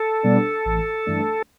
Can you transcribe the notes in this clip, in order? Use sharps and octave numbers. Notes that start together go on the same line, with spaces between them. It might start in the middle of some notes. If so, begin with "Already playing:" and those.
Already playing: A4
B2 G3 B3 D4
A1
G2 E3 A3 D4